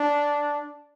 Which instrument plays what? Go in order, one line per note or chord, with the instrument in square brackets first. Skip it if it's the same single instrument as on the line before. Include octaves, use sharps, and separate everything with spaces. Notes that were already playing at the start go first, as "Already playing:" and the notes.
Already playing: [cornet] D4